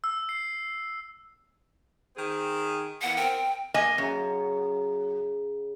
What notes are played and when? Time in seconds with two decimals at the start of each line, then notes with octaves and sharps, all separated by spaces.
0.04 E6
0.29 C7
2.16 D#3 C4 G#4
3.02 E3 A#3 B3 F#5
3.17 C4 A#4 G5
3.74 A#3 D#5 G#5
3.98 F#2 C#3 F#5 A#5